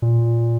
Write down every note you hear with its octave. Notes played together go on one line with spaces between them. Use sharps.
A#2